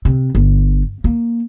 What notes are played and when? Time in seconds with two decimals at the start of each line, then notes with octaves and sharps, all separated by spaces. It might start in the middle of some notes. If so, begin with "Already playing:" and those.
0.05 C3
0.35 G1
1.04 A#3